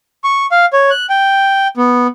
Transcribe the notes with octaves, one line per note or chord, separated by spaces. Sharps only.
C#6
F5
C#5
F#6
G5
B3